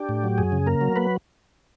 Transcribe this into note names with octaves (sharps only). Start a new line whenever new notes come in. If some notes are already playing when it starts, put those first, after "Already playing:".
Already playing: D4 G4
A2
F#3
F#2 G#4
C#3
A#3 A#4
F#3
A#3 B4